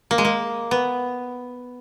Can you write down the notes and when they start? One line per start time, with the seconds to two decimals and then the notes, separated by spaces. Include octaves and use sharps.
0.11 A#3
0.18 G#3
0.25 A#3
0.71 B3